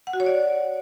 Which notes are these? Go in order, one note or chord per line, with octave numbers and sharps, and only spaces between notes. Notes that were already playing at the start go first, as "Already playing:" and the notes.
F#5
F#4
C#5
D5